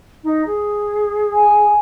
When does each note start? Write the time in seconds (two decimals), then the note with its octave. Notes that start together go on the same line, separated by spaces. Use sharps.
0.24 D#4
0.46 G#4
1.32 G#5